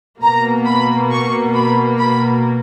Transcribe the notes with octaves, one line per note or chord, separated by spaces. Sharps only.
B2 A#3 A#5
B5
C#6
B5
B5